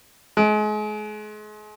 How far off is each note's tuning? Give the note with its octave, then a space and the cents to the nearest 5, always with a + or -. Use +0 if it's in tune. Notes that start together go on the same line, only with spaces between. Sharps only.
G#3 +35